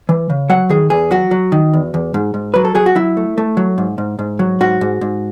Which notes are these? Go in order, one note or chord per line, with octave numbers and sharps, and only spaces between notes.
E3
C#3
F#3 F#5
D#3 G#4
E2 G#4
F#3 F#4
F#3
D#3
E2
E2
G#2
G#2
F#3 B4
A4
F#3 G#4
F#4
F#3 E4
A3
A3
F#3
G#2
G#2
G#2
F#3
G#2 F#4
G#2
G#2